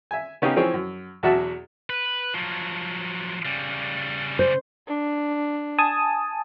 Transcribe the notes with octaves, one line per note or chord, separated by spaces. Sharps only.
E5 G#5
C#3 B3 C#4 D#4 G4 G#4
E3 F3 C4 G#4 C#5
F#2
E2 B2 F#3 F#4 E5 A5
B4
F3 F#3
C#3 G3
C5
D4
G#5 A5 D#6